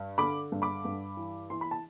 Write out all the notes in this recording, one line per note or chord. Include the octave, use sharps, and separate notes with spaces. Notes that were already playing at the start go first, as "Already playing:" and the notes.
Already playing: G2
D3 B5 D6
G2
B5 D6
G2
E3
E3 C6
B5
A5